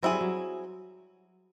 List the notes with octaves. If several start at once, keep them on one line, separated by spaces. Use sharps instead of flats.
F#3 C4 E4 G#4
G3
F#3